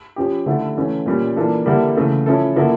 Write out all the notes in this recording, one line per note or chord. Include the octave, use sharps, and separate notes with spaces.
F3 C#4 G4
D3 A3 E4 A4
E3 A3 C#4
A#2 G3 C#4
E3 A#3 D4 F4 A4
D3 G3 A#3 E4 A4
C#3 E3 A3
F3 C#4 E4 A4
D3 F3 A#3 E4 A4